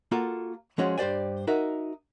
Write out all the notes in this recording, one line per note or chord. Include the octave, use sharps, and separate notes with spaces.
A#3 F4 F#4 A4 A#5
F3 G#3 C#4 F#4 G#4
G2 G4 C5 D5 G#5
D#4 F#4 A#4 E5